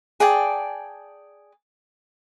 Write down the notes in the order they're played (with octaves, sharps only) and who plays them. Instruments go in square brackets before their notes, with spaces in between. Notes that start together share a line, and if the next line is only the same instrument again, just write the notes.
[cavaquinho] G#4 D5 G5 A5